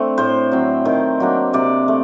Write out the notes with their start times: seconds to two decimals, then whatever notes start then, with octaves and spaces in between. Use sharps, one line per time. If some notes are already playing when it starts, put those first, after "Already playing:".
Already playing: A3 C4 D4
0.18 A2 C5
0.52 F#3 C4
0.85 D#3
1.20 F#3 A#3 D4
1.53 C3 D5
1.88 A3